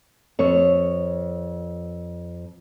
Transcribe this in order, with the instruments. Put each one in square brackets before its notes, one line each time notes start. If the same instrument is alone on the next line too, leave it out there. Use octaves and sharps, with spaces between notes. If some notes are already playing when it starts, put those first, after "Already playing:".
[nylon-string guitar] F2 C#5